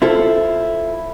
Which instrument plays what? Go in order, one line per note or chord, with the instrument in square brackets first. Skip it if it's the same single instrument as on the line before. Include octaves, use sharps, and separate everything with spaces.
[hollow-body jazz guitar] E4 F4 A4 C5